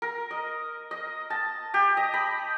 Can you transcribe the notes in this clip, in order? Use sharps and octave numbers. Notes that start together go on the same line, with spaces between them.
A#4
D#5
D#5
A5
G4
D#5
B5